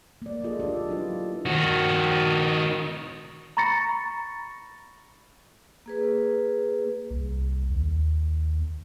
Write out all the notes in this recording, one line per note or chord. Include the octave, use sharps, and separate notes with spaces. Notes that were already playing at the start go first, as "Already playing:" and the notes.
A#3 D5
F4 G#4 A4 D#5
D4 G4 A4 D5
F#3 D4 E4 F4 B4
D#3 F#4
A#5 B5 C#6 A6 A#6 C#7
A#3 G#4 B4
C2
D#2